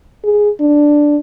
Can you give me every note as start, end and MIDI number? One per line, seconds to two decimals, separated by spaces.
0.24 0.50 68
0.60 1.17 62